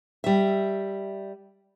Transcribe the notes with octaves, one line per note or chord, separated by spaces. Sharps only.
G3 E5